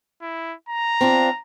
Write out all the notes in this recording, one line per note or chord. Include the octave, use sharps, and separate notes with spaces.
E4
A#5
C4 D4 F4